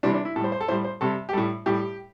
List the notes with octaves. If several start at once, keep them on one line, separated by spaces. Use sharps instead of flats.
C3 E3 G3 D4
D4
E4
A2 G3 A4 C5
C5
A4
A2 G3 C5
C5
C3 G3 A4
G4
A2 G3 A4
A2 G3 G4